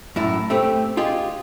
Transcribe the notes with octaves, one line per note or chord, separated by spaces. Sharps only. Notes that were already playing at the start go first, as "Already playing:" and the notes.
F#2 A2 E4
A3 C4 G4
F4 G4 G#4 D#5